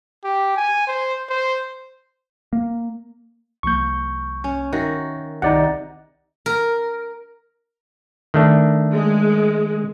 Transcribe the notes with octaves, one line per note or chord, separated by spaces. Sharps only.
G4
G#5
C5
C5
A#3
C2 F3 A#3 C#6 G6
C#4
D#3 F#4 A#4 E5
C2 C3 D#3 D#4 D5 F#5
A#4
D#3 A3 D4
G#3